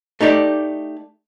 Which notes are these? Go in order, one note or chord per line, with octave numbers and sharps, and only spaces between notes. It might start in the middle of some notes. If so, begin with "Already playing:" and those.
A3 D#4 G4 D5